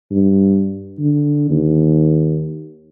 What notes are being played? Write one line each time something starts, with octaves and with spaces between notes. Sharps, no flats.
G2
D3
D#2